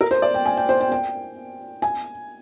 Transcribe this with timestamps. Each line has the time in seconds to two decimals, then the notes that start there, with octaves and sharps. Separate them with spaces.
0.01 A#4
0.11 C5
0.22 D5
0.34 G5
0.46 G#5
0.57 G5
0.69 C5
0.81 G5
0.92 G5
1.82 G#5